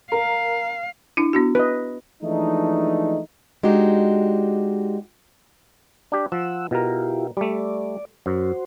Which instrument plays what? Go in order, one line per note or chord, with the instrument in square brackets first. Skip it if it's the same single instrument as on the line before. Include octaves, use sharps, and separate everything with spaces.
[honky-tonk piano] A#4 [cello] F5
[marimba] D4 E4
B3 D4 F#4
[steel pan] B4 D#5
[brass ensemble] E3 F3 G#3 A3 D4 D#4
[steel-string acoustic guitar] G#3 D4 D#4 F#4 G4
[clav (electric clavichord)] D4 G4
[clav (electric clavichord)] F3 [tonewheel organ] F#5 E6
[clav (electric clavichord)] B2 A#4 [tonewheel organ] E4 F4 G4
[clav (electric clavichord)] G3 A3 [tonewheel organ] D5
[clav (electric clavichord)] F#2 [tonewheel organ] F#4 C5